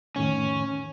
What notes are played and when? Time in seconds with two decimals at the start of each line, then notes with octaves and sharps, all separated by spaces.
0.16 F2 A2 D#3 C#4